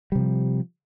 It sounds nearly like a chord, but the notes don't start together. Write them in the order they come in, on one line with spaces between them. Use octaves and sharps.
G3 C3 F3